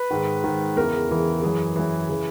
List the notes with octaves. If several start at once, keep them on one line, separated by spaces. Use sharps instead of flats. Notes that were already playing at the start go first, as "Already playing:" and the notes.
Already playing: B4
G#2 D#3
G#2 D#3
E2 C#3 E3 A#4
E2 C#3 E3
F#2 E3 G#4
F#2 E3
C#3 E3